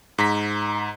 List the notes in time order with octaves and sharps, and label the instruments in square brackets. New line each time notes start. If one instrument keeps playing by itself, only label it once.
[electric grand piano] G#2 A#5 B6